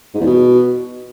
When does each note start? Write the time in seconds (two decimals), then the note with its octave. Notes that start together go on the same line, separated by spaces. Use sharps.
0.14 G#2
0.20 E2
0.26 B2